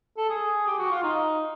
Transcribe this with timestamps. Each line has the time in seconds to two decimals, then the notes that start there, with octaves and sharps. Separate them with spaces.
0.17 A4
0.29 G#4
0.67 G4
0.79 F#4
0.91 F4
1.03 D#4